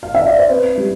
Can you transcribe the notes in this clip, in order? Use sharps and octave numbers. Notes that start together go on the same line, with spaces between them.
F5
E5
D5
C5
C4 B4
G3